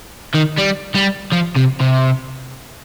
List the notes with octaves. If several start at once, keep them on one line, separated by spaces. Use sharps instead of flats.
D#3
G3
G3
F3
C3
C3